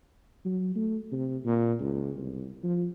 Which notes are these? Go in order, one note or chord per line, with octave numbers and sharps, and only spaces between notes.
F#3
A3
C3
A#2
C#2
C2
F3